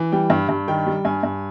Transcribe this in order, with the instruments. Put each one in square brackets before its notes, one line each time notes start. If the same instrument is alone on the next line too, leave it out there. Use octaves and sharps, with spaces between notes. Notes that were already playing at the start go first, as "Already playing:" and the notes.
Already playing: [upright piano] E3
G3 G5
G2
G2
D#3 G5
G3
G2 G#5
G2